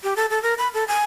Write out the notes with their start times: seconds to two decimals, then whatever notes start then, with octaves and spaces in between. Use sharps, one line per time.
0.03 G4
0.16 A4
0.30 A4
0.42 A#4
0.58 B5
0.74 A4
0.88 G#5